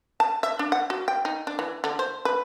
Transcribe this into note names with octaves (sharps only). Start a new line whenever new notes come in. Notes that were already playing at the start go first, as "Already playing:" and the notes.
A5
E5
D4
F#5
F#4
G5
D#4
D4
E3
D3
C5
B4